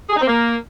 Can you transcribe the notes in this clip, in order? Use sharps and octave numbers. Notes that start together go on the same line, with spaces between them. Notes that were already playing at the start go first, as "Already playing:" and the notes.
G#4
D#4
C4
A#3